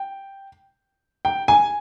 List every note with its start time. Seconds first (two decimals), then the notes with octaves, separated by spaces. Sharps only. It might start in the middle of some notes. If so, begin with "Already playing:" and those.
Already playing: G5
1.25 G5
1.48 G#5